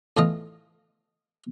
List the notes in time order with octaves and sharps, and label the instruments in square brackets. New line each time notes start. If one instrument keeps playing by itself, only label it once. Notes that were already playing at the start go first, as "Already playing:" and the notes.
[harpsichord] A2 E3 F4 D#5